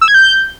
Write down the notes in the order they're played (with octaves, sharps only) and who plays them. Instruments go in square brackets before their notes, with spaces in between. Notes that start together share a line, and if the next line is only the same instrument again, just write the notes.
[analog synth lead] E6
G#6
G6